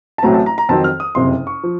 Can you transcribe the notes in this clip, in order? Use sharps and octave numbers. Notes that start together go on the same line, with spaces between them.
A5
A1 A2 F#3 A3 C4 A#5
A5
A#5
A#5
F2 D#3 F#3 C4 A5
F6
D#6
F#1 F2 C3 C6
C#6
F3